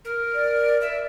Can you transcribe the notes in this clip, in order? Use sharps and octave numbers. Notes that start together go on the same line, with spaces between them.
A#4
D5
E5